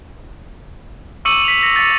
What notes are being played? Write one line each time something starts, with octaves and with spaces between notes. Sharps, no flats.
C#6 D6 E6 C#7 D#7 F#7
B6 F7
A#6 C#7
A6 C#7